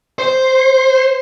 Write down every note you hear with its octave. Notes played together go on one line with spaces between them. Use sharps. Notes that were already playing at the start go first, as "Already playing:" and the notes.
C5